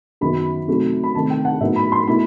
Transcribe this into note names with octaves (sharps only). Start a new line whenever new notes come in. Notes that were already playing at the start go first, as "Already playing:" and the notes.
F#2 D#3 F#3 B3 B5
C3 F#3 A3 D#4
B5
C3 D#3 A3 A5
G5
F#5
A2 F#3 B3 D#4 E5
B5
C6
B2 A3 E4 B5